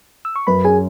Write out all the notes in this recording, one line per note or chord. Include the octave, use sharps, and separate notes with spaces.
E6
C#6
F#2 B4 B5
C#4 G#4 G#5